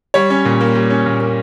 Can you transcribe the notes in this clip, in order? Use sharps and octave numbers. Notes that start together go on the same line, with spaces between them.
G3 C#5
C#4
A#2
A#3
G3
C#4
A#2
A#3